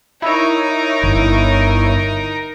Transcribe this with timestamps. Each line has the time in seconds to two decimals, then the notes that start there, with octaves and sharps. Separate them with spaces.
0.22 D#4 E4 A#4 C#5
1.04 G1